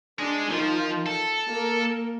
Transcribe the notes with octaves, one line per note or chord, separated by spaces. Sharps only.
G#3 D4
D#3 F3 F4
A4 A5
A#3 A#4